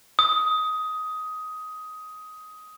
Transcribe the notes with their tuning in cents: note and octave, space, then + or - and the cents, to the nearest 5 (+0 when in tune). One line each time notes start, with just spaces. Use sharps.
D#6 +15